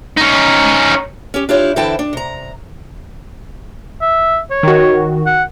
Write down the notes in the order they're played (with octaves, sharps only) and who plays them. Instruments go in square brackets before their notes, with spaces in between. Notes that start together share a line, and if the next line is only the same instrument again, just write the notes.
[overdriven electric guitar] C#4 D#4
[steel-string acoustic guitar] C#4 G4
D4 E4 F4 G4 C#5
D3 E3 E4 C5 G5 A5
D4
C3 A#5
[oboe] E5
C#5
[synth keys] D#3 F#4
[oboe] F#5